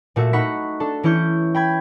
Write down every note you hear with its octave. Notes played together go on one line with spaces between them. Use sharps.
A#2 A3 F#4 E5
A3 D#4 F#5 B5 C#6 B6
D4 A4
E3 C#4 E4 C#6 G6
G5 B5 G#6